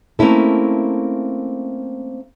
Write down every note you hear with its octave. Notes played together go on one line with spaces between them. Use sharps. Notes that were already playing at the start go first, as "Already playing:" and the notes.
A3 A#3 C4 C#4 E4 A4